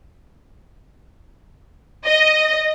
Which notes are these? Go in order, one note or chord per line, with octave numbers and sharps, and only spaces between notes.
D#5